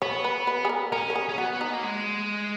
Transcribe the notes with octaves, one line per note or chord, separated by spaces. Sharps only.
B3 C#5
B4
B4
G#4
A#4
C#4 A#4
A#4
G#4
C#4
B3 F#4
D#4
A#3
G#3